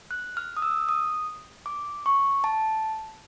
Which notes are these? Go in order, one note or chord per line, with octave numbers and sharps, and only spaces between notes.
F#6
F6
D#6
E6
D#6
D6
C#6
A5